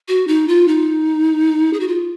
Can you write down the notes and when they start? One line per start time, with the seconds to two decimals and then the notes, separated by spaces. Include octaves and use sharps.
0.08 F#4
0.28 D#4
0.48 F4
0.68 D#4
1.73 G#4
1.80 F#4
1.88 F4